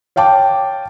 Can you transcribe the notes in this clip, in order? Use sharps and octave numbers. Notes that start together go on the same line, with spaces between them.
C#5 F5 G5 A5 D6